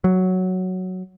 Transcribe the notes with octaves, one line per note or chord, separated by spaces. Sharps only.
F#3